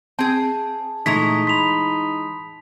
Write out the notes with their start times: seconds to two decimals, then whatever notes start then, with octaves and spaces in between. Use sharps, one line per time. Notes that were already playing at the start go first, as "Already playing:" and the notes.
0.19 C4 G#4 A5
1.06 A#2 E3 G#3 A3 D#4 A#5 C#6 B6
1.47 B5 C6 B6 F7